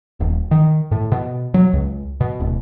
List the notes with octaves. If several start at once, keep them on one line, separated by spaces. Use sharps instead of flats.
D#1
D#3
A2
B2
F#3
C#2
B2
D1